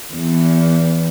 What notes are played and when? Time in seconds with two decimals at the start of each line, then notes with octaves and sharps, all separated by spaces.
0.14 E2